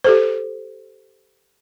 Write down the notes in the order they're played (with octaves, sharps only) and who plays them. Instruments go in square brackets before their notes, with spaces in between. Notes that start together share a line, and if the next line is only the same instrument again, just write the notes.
[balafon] G4 A4 C5